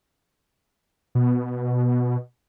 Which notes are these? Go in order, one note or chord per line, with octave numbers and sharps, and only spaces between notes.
B2